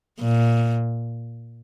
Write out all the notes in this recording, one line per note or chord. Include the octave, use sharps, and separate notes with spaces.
A#2